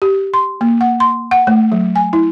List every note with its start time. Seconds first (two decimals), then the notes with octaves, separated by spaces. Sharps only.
0.02 G4
0.34 C6
0.61 A#3
0.81 F#5
1.00 C6
1.31 F#5
1.47 A3
1.72 F#3
1.96 G#5
2.13 E4